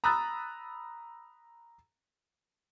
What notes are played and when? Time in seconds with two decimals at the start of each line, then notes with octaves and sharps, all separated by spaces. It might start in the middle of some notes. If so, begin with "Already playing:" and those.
0.04 A#5 B5 D#6 E6 F#6 A6